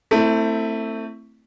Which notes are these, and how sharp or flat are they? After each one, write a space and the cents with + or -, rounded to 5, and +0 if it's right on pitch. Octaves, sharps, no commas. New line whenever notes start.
A3 +25 C4 +5 E4 -5